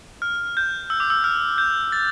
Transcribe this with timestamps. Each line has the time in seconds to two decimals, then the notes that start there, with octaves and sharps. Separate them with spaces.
0.22 F6
0.57 G6
0.90 E6
1.00 D6
1.10 E6
1.24 F6
1.58 G6
1.92 A6